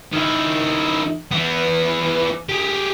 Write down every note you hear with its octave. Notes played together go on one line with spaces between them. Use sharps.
D#3 E4
E3 B3
G4 G#4